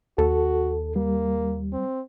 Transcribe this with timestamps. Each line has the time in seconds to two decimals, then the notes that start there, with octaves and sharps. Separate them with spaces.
0.18 D#2 F#4 A4
0.96 G3 A#3
1.73 C4